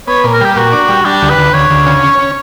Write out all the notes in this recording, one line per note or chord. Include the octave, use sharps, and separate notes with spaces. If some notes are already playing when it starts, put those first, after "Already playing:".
B3 C#5
A#2
A#4
G3 G4
A#2 F#4
D4
G3
G3 D4
D2
B4
D2
D2 C#5
D2
C#3
C#4
C#4